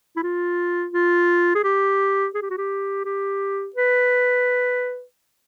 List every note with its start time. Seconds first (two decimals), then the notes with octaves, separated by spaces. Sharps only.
0.17 E4
0.23 F4
0.94 F4
1.55 G#4
1.64 G4
2.34 G#4
2.42 G4
2.50 F#4
2.58 G4
3.05 G4
3.76 B4